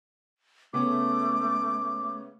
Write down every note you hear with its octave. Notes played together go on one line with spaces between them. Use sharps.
C#3 A3 B3 C#4 D6